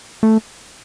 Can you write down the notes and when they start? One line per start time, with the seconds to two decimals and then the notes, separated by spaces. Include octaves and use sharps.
0.23 A3